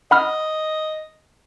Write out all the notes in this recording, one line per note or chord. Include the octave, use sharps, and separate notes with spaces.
D#5 F#5 B5 F6